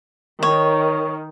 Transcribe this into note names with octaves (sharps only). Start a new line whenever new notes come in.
D#3 C#5